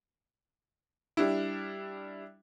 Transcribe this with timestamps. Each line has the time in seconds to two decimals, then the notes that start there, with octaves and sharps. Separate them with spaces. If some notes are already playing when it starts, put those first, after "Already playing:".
1.17 G3 D4 E4